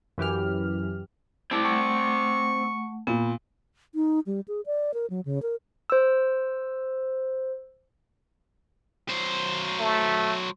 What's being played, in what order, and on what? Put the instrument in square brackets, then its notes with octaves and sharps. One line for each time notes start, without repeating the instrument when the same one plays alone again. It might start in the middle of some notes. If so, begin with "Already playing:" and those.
[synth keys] F#2 E3 G4 F6
[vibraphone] A3 E4 [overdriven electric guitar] C4 D5
[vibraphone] A3 F#5 [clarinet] C#6
[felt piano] A#2 [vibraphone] B3
[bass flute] D#4
G3
G#4
D5
A#4
F#3
C#3
A#4
[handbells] C5 E6
[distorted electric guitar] F#3 C5
[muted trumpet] A3